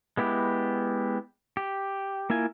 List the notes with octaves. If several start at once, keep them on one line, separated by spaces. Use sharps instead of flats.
G#3 B3 E4 G4
G4
A#3 E4 F4 G#5